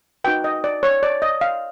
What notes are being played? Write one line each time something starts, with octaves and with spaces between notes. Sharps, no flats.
D#4 F#4 B4 G5
D#5
D5
C#5
D5
D#5
F5